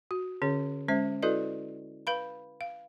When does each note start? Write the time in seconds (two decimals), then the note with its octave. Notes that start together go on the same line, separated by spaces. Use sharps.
0.11 F#4
0.42 D3 C#4 G#4 C#5
0.88 G#3 C#4 C5 E5
1.23 E4 F#4 A4 B4 D5 D#5
2.07 B4 F5 B5
2.61 F5